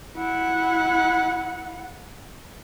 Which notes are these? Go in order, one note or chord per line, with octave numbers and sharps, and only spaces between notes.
E4 F#5